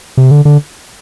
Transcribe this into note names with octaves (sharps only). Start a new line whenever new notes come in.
C3
D3
D3